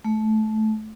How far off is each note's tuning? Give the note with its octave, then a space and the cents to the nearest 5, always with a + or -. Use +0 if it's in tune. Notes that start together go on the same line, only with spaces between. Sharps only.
A3 -20